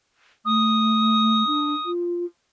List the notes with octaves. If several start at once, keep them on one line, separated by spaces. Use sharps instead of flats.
A3 D#6
D4
F4